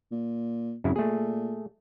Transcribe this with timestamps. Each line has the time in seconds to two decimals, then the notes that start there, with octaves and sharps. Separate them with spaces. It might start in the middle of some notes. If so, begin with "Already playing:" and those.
0.11 A#2
0.84 G#1 F#2 C#3 E4
0.96 A#2 A3 G#4